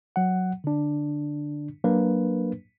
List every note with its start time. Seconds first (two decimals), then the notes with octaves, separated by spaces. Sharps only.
0.16 F#3 F#5
0.64 D3 D4
1.84 F#3 A#3 D4 B4